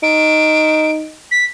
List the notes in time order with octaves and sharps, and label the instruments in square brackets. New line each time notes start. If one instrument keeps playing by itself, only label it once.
[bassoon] D#4 [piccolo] D7
[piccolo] B6